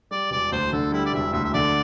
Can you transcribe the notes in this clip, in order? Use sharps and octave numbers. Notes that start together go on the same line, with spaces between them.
G3 D5
E1 D5
D2 C5
D3 A4
G3 E4
D5
E1 E5
D2 E5
E5
D3 D5